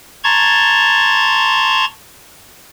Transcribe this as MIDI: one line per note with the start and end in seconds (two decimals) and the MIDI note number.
0.24 1.85 81
0.24 1.85 82
0.24 1.85 84
0.24 1.85 85
0.24 1.85 92
0.24 1.85 93